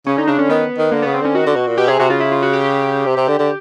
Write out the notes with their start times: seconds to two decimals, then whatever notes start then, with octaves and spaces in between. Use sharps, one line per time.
0.07 C#3 C#4
0.18 D3 D#4
0.27 C#3 D4
0.39 D3 C#4
0.49 D#3 B3
0.78 D#3
0.92 D3 A#3
1.02 C#3 B3
1.14 C4
1.21 D3 C#4
1.35 D#3 F#4
1.46 D3
1.56 B2
1.67 A#2
1.78 B2 G4
1.88 C3 G#4
1.99 C3 F#4
2.10 C#3 F4
2.20 E4
2.32 F4
2.43 F#4
2.53 G4
3.06 C3
3.17 C3
3.28 D3
3.39 D3